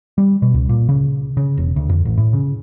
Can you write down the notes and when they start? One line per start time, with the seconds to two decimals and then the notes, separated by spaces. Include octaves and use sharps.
0.18 G3
0.42 B2
0.54 C#2
0.69 A#2
0.89 C#3
1.37 C#3
1.57 E1
1.76 D2
1.89 F2
2.05 A1
2.17 A2
2.33 C#3